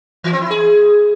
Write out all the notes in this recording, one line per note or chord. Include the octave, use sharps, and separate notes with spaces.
E3
C4
E4
G#4